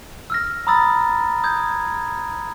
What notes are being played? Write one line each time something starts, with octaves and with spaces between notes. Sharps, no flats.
E6 F6 A#6
A#5 B5 D#6 E6 A6
D#6 G6 G#6